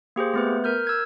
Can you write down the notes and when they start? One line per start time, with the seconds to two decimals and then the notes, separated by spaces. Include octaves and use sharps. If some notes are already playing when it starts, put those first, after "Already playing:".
0.16 A#3 G4 G#4 C5
0.34 A3 B3 B4
0.64 A#4 F6 G6
0.87 E6 G#6